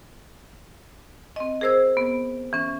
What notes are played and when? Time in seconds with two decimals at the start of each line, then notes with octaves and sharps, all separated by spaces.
1.36 C4 D#5
1.61 G#4 A#4 C5 E6 G#6
1.97 B3
2.53 E3 C#4